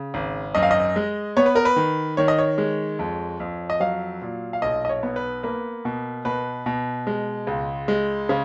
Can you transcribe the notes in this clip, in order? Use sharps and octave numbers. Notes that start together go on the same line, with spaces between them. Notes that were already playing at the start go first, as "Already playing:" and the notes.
Already playing: C#3
G#1
F#2 D#5
F5
D#5
G#3
B3 C#5
B4
A#4
B4
D#3
D#3 C#5
D#5
C#5
G#3
F2
F2
D#5
F#3 F5
A#2
F5
B1 D#5
D#5
C#5
B3
B4
A#3 B4
B2
B2 B4
B2
G#3
C#2
G#3
C#3